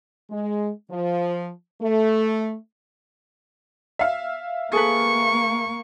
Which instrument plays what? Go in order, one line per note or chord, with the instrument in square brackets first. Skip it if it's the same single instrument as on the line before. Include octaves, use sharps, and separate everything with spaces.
[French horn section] G#3
F3
A3
[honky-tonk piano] E5 F5
[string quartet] A#3 [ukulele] G#4 A4 B4 [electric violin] C#6